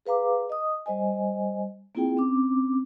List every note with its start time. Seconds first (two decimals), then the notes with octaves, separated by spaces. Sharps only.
0.06 G#4 B4 F5 A#5 D6
0.50 D#5 D#6
0.86 G3 C5 D#5 G#5
1.95 A#3 C4 E4 F4 G#4 G5
2.17 C4 C#4 D6